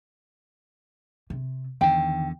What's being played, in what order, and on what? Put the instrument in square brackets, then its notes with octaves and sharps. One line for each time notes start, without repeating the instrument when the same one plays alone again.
[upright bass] C3
[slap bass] E2 D3 [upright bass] D#3 [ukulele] G5